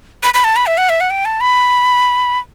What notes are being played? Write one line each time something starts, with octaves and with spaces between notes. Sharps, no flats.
B5
B5
A5
B5
E5
F#5
E5
F#5
G5
A5
B5